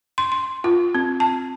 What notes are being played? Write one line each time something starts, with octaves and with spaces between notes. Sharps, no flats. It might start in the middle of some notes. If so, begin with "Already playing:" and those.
C6
C6
F4
C4
A5